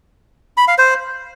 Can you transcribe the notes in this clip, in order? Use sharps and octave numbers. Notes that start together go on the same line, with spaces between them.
B5
F5
C5